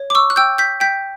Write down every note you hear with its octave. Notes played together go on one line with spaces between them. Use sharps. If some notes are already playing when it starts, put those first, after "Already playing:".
Already playing: C#5
D6
C#6 E6
F#6
G5 E6 G6
G6 B6
G5 G6 B6